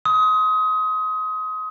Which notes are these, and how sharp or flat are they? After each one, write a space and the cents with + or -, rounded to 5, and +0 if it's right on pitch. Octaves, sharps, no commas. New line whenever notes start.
C6 +0 D#6 +25